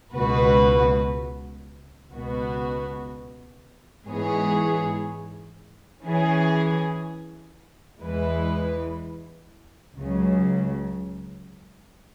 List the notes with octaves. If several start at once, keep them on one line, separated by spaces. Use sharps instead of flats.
C#2 B2 B3 F#4 B4
C#2 B2 B3 F#4
G#2 E3 B3 G#4 C#5
E3 C#4 G#4
E2 E3 G#3 E4 B4
C#2 C#3 F#3